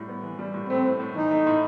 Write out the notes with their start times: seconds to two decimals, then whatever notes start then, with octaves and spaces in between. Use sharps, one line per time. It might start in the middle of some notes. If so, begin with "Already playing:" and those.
Already playing: A2 G3
0.08 B3
0.23 E3
0.39 G3
0.54 A2
0.69 A3 C4
0.85 A2
1.00 A2
1.15 E3 D#4
1.31 A3
1.47 A2